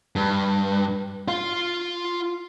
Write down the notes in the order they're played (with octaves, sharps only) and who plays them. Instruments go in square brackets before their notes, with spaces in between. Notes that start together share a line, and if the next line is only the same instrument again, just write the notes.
[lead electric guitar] G2
F4 F5